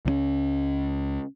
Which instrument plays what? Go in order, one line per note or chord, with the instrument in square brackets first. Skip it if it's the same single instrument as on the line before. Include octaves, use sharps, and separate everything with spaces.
[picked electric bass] C#2 F#3 C#4